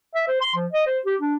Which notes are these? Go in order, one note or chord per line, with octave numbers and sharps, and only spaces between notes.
E5
C5
C6
F3
D#5
C5
G4
D4